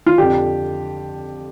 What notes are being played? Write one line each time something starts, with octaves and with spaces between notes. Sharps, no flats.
F4
F2 D3 G4